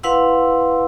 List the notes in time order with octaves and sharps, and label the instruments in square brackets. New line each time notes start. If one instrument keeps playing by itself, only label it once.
[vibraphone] E4 B4 F5 F#5 C6 E6